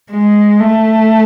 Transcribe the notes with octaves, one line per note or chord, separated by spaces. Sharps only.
G#3
A3